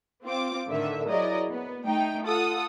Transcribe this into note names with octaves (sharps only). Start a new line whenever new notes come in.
C4 F4 D6
A2 D3 D#3 E5
F#3 E4 G#4 A#4 D5 D#5
B3
A3 D#4 G5
F4 A4 F#5 D#6